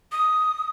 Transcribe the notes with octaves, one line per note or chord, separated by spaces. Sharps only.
D#6